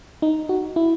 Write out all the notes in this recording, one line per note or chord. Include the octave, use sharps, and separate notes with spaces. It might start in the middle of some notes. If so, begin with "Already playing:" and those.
D#4
F#4
E4